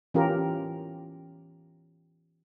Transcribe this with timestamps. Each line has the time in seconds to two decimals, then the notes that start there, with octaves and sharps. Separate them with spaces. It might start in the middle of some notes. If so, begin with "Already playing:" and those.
0.14 E3 C#4 F4 G4 A#4